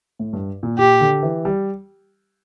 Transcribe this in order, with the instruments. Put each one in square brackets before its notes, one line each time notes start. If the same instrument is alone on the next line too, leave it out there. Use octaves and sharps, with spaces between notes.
[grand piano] A2
G2
A#2
[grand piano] A#2 [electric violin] G4
[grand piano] D3
E3
G3